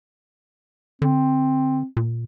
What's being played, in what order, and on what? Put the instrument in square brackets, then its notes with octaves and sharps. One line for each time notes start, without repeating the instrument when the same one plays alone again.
[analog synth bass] D3 [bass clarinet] C4
[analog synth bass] A#2